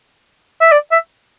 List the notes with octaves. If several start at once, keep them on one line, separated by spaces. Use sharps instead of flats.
E5
D5
E5